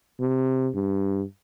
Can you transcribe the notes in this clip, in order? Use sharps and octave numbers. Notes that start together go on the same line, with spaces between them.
C3
G2